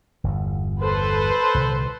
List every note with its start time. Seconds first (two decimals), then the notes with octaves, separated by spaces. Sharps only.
0.24 G1 E2
0.82 A4 B4 C5
1.54 C2 A#2 D3